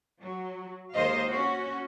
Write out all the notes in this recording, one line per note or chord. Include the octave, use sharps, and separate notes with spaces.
F#3
D#2 G#3 C5 D#5 F5
C#4 F#4